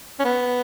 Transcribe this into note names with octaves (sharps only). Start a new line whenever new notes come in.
C#4
B3